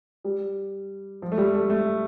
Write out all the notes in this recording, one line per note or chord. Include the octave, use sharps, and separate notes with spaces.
G3
F3
A3
G3
A3
A3